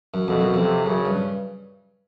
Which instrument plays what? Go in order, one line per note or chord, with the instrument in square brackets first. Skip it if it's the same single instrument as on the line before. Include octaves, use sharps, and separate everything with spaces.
[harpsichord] F#2
[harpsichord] F2 [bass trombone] B2
[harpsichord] F#2
[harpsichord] F2 [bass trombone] C3
[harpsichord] F#2 [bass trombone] C#3
[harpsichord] G2